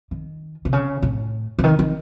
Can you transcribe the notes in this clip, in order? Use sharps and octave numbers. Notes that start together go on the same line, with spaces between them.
D#3
C3
C#3
A2
C#3
D#3
D#3